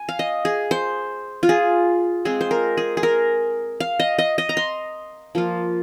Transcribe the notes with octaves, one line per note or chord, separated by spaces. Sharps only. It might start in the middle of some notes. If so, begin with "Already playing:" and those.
Already playing: G#5
F5
D#5
G#4
C5
F4
G#4
G#3 C4 F4 G#4
C5
A#4
G#4
G#4
A#4
F5
D#5
D#5
D#5
A#5
C6
F3 A#3 F4